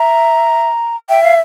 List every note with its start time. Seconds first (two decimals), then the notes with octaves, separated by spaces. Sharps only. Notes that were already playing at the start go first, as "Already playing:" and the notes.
Already playing: E5 A#5
1.09 E5 G5
1.24 F5